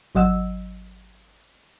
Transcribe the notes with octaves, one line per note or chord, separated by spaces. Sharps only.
G#1 F#3 D#5 F#5 E6